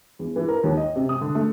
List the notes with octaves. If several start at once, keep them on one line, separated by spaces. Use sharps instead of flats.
E2
E3
A#4
D#2
D#5
C3
D#6
D3
A3